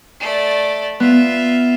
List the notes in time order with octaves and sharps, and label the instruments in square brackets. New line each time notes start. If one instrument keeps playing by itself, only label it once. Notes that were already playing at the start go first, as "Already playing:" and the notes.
[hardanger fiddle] A3 D5
[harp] B3 [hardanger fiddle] F4 E5